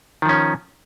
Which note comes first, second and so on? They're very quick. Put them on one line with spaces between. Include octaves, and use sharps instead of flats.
D#3 F3 C#4